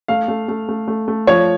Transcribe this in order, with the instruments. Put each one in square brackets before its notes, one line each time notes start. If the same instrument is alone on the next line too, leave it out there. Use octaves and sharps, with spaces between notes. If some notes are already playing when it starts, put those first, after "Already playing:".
[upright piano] A3 [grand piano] F5
[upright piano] A3
A3
A3
A3
A3
[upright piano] F3 [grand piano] C#5